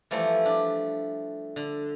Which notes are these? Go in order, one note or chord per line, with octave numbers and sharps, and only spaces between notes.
E3 F3 G3 A3 E4
D4
D3